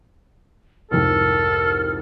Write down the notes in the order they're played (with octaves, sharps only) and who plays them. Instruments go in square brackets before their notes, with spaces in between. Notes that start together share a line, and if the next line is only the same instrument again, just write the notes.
[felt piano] C2 F2 G#2 [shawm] A4 [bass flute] A#4 [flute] F6